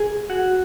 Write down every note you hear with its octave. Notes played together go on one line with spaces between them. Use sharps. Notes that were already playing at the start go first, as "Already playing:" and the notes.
Already playing: G#4
F#4